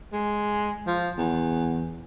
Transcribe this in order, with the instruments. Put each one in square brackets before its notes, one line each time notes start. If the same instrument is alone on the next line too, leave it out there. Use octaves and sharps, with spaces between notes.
[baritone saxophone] G#3
F3
E2